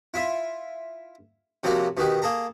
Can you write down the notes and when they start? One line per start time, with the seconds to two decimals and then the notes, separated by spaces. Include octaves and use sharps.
0.14 E4 F4 E5
1.64 C3 F3 F#3 A#3 F#4
1.97 B2 D#3 F#4 G4
2.22 A#3 G#4 A4 A#5